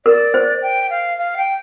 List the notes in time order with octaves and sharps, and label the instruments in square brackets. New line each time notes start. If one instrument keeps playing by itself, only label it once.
[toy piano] A#4 [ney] D5
[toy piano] C5
[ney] G5
F5
F5
G5